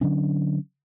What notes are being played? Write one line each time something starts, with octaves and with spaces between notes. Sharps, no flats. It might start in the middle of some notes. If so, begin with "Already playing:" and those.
D3 F#3 C#4 D4